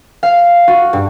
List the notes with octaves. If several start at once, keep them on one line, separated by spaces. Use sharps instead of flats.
F5
F#4
G2